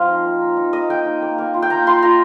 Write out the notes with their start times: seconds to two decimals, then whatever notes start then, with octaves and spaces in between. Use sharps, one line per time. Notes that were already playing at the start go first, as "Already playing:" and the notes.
Already playing: F3 C4 F5 C6
0.08 D#4
0.25 A#3
0.41 D#4
0.57 D#4
0.73 A#3 D#5
0.89 A#3 G5
1.05 D#4
1.22 A#3
1.38 A#3
1.54 F4
1.62 G5
1.70 A#3 A#5
1.86 F4 C6
2.02 F4 A#5